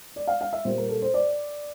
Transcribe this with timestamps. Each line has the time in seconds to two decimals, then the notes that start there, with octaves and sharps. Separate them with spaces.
0.16 D5
0.27 F5
0.41 F5
0.53 E5
0.65 A#2 G3 A#3 C5
0.78 A#4
0.89 A4
1.02 C5
1.14 D5